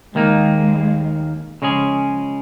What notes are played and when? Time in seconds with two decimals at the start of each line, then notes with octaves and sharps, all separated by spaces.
0.14 D#2 D#3 G#3 A#3 D#4
1.62 C#3 F3 G#3 C#4 G#4